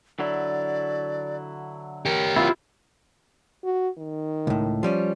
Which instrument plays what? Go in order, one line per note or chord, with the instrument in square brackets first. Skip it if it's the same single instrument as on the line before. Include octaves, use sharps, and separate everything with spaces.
[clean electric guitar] D3 F#3 E4 [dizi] D5
[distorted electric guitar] G4 C#5 [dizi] A#4
[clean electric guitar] C3 F#3 B3 [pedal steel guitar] E4 F4 F5
[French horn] F#4
D#3
[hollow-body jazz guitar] C#2 A2
F3 G3 C#4